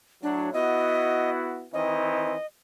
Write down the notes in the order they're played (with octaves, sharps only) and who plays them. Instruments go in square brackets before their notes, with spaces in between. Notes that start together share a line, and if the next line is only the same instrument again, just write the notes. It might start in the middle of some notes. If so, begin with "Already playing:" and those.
[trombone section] A2 F#3 [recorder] D4
[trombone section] B3 E4 F#4 [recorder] D#5
[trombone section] D#3 E3 C4 [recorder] D#5